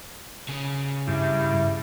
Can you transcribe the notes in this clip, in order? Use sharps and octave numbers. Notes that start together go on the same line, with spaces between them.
C#3
G2 E4